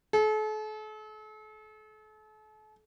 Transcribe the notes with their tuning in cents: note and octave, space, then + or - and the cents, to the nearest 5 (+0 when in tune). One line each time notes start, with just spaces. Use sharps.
A4 -40